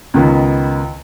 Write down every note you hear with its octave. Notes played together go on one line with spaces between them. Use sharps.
C#2 D#3 B3